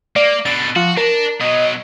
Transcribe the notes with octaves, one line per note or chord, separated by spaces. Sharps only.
A#3 D5
B2 D3 A6
F3 F#4
D4 A#4 A5
B2 F#3 D#5